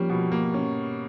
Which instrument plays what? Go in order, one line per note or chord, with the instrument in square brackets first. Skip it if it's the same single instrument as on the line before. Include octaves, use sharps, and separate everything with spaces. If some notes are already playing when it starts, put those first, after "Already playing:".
Already playing: [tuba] F3 [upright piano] G3 A#3 C#4
[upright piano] B2
A#3
C#4